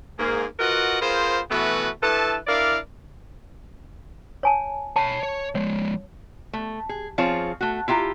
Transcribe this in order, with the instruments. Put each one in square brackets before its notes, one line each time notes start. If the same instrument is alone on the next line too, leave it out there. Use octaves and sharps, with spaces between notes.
[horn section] G#2 A#3 G#4
F4 F#4 A#4 B4 D#5 F#5
B3 F4 G#4 A#4 C5
B2 E3 A3 B3 F#4 B4
G2 E4 A4 B4 A5
D4 E4 A#4 D5 F5
[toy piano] C#5 G#5 A5
[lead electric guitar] C#5 B5 [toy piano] A5
[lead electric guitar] C#5
[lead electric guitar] F3 G#3 [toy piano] C#5
[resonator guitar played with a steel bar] A3
G#4
F3 C4 F4 G#4 C5 C#5
A3 F#4
E4 F4 G4 A#5